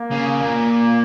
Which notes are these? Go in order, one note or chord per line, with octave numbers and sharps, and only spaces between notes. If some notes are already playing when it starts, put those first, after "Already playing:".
Already playing: A#3
C#3
A#2